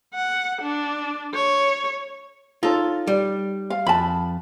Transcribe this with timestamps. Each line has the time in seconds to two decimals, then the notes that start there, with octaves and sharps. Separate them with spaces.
0.14 F#5
0.62 D4
1.34 C#5
2.63 D#4 F4 A4 C#5
3.07 G3
3.70 F5
3.86 F2 A5 B5